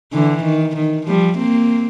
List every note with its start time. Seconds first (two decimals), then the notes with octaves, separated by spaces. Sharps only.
0.13 D3 E3
0.44 D#3
0.76 D#3
1.07 F3 G3
1.38 A#3 C4